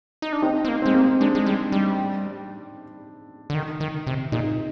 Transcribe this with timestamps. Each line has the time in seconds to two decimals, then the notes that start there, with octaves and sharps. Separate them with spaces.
0.22 D#4
0.32 D4
0.42 C4 D#4
0.65 C4
0.68 A#3
0.82 G#3 C4
0.94 A#3
1.21 G#3 D4
1.35 G#3
1.46 G3
1.72 G3
3.50 D3
3.55 D#3
3.80 D#3
4.07 C3
4.32 A#2 D#4